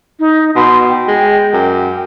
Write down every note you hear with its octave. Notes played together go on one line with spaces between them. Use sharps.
D#4
B2 C6
G5
G#3
F#2